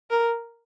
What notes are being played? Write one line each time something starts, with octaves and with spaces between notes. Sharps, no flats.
A#4